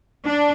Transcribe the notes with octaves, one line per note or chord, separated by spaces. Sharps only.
D4